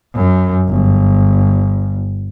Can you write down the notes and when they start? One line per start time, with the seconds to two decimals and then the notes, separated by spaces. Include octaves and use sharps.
0.14 F#2
0.68 G1